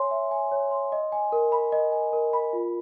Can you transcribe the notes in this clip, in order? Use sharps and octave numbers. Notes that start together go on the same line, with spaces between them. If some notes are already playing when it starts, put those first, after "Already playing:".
Already playing: C#5 E5 G#5 C6
E5
G#5
C#5
C6
D#5
G#5
A#4
B5
D#5
G#5
A#4
B5
F4